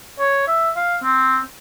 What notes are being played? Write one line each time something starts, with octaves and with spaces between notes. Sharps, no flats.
C#5
E5
F5
C4